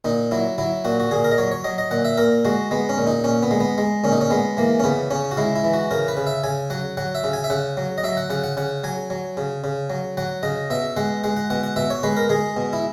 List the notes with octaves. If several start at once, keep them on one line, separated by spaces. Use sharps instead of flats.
A#2 D#4
F#3 E4
F#3 E4
A#2 F#4
F#4
A#2 G#4
A#4
D#5
F#3 C#5
C#5
F#3 D#5
D#5
A#2 F#5
E5
A#2 A#4
G#3 F#4
G#3 B3
C#4
A#2
D#4
A#2 C#4
B3
G#3
B3
G#3
A#2 C#4
D#4
C#4
G#3 B3
E3 A#3
C#4
C#3 B3
C#3 C#4
F#4
G#3 E4
E4
E3
F#4
C#3 A#4
B4
C#3
E5
C#3 G#5
F#3 F#5
F#3 F#5
E5
C#3
G#5
E5
C#3 F#5
F#3
D#5
F#3 E5
F#5
C#3 F#5
F#5
C#3 F#5
F#3 G#5
F#3
C#3
C#3
F#3
F#3 F#5
C#3 D#5
B2 E5
G#3 F#5
G#3 F#5
F#5
B2 F#5
F#5
B2 E5
C#5
G#3 B4
A#4
G#3 G#4
B2
E4